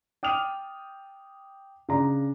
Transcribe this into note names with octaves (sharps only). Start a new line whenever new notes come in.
G5 D6 D#6 F6 D#7 F7
C#3 D4 A#5